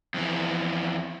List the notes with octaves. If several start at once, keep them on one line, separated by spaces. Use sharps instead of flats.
F2 E3